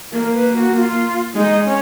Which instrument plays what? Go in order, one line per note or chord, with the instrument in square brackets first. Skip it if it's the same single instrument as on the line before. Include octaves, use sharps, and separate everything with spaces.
[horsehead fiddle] A#3 [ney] A#4
[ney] B4
F#4
F#4
F4
[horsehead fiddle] G#3 [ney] D#4
[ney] C#4